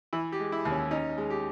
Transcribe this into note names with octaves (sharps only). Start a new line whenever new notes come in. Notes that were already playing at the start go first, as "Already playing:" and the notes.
E3 E4
G4
G#3
E4
D#2
C#4
C#4 D#4
G#3
G4